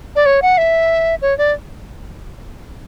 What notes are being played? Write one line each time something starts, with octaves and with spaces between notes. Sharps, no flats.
D5
C#5
F#5
E5
C#5
D5